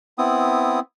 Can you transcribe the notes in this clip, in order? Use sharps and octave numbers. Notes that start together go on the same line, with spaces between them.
B3 C4 E4 D#6